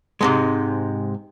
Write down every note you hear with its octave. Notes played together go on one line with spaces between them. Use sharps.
G#2 C3 G#3